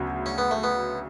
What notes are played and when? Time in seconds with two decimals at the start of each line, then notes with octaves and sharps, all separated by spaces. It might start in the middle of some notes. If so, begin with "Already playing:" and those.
Already playing: D2 C#3 F#3 B3 F#4
0.26 C#4
0.38 B3
0.51 A3
0.63 B3